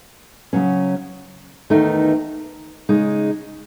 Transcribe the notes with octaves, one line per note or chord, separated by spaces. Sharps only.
C#3 F#3 C#4
E2 D#3 A3 D#4
C#3 G#3 D#4